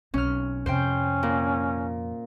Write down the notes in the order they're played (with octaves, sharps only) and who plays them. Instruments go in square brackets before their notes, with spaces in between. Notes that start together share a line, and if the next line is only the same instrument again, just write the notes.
[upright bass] B1 [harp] C#4 F6
[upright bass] F2 C3 [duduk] C#4 [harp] C5 G5
[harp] A#2